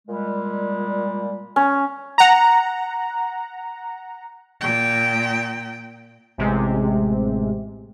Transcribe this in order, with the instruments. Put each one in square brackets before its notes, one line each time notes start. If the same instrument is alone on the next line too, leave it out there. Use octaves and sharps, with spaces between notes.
[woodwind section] A#2 G3 G#3
[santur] C#4
[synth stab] F#5 A#5
[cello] A#2 G5
[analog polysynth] A1 C3 G#3